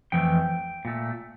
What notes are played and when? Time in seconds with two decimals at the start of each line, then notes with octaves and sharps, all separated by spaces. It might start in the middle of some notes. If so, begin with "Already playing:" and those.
0.12 F2 E3 A3 G5
0.85 A#2 A3